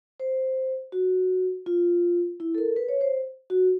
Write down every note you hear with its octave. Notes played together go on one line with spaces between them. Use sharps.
C5
F#4
F4
E4
A4
A#4
B4
C#5
C5
F#4